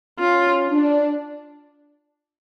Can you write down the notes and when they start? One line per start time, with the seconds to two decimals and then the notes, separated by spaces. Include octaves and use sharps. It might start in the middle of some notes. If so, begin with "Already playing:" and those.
0.20 C#4 F4
0.69 D4